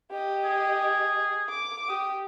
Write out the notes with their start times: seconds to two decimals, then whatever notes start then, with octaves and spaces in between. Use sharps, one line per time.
0.11 G4 D#5
0.44 G#4
1.49 D6
1.89 G4 D#6